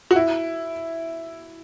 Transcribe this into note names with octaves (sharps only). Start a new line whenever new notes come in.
F#4
E4